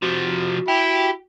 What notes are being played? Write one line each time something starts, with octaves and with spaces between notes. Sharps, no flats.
C3 F3 F#4
E4 G4